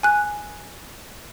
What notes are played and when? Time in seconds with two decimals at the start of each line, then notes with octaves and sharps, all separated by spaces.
0.03 G#5 F#6